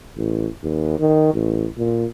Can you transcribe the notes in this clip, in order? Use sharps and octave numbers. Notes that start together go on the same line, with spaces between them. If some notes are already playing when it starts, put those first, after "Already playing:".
A1
D#2
D#3
A1
A#2